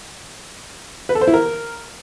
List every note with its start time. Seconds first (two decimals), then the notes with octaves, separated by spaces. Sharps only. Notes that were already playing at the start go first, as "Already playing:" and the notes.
1.09 B4
1.15 A4
1.21 C5
1.28 E4
1.34 A#4